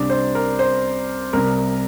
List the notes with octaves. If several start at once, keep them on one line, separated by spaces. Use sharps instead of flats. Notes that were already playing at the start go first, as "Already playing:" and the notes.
Already playing: C2 C3 D4
C5
A#4
C5
C2 C3 A#4